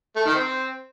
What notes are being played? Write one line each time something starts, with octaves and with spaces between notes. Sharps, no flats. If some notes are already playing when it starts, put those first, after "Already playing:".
A3
D#3
C4